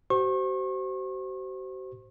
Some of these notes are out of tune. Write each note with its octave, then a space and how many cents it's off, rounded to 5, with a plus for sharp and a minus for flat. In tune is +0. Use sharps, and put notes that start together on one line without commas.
F#4 +45 C5 -10 C#6 -40